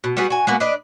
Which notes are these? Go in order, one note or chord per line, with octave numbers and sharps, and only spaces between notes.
B2
G3 B3 F#4 G#4
F#4 G#5
G#3 A#3 B3 F#4
D4 B4 D5 D#5